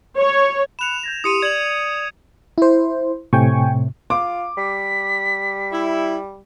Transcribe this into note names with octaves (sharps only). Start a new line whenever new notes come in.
C#5
B5 F#6 C#7 E7 F7
G6 G#6 A#6
E4 G4 C6 D#6 C#7 D#7
D5 G#6 F#7
E4 C5
A2 C3 G5 G#5 C#6
F4 D6
G3 B6
E4